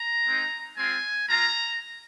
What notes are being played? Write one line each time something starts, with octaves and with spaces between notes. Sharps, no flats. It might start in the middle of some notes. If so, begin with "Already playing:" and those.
Already playing: A#5
G#3 C4 D#4
G#3 C4 F4 G#5
G#3 F4 A#5